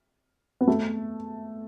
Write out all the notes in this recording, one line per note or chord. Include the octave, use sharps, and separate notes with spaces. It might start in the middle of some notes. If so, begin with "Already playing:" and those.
B3
A3